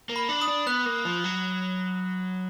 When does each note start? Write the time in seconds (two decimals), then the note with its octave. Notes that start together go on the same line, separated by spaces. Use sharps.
0.09 A#3
0.16 B5
0.29 D4
0.41 D#6
0.48 D4
0.67 B3 F#6
0.86 A#3
1.05 F3
1.24 F#3